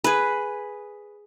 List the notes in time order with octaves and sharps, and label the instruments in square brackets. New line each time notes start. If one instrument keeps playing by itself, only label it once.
[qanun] G#4 B4